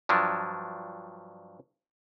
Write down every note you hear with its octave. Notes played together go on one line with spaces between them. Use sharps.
G2 F3 F#3 D4